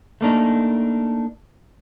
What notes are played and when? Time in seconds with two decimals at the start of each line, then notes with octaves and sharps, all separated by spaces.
0.21 A3 A#3 D4 D#4